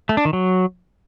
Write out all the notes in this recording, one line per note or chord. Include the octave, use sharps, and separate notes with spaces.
A3
D4
D#3
F#3